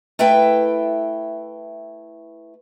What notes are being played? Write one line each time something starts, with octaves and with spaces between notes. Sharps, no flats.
A3 E4 B4 E5 G5